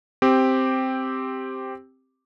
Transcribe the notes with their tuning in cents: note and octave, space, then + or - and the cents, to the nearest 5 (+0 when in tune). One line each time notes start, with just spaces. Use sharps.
C4 +0 G4 +0